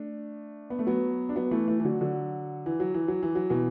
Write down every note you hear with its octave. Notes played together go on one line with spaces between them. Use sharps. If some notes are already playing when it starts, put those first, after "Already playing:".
Already playing: A3 D4
B3
A3
F#3 B3
D4
F#3 B3
E3 A3
E3 A3
E3
D3 F#3
D3 F#3
E3
F#3
E3
F#3
E3
F#3
B2 E3